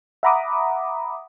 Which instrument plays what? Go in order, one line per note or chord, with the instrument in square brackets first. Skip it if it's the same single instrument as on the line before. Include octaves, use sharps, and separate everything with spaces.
[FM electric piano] E5 F#5 A#5 B5 D6 D#6